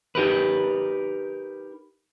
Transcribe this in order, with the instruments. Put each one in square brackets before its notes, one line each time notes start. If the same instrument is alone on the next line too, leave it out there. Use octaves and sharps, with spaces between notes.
[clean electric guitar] D#4 G4 A#4 B4